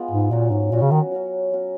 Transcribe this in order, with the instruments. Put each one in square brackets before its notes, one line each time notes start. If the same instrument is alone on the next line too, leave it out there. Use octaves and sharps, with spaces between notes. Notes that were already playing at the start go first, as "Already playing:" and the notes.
Already playing: [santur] G#3 B3 F4
[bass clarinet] G#2
[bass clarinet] A#2 [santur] F#3 C#4 F#4
[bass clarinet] G#2
[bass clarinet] A#2 [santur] F#3 C#4 F#4
[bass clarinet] C#3
D#3
[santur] F#3 C#4 F#4
F#3 C#4 F#4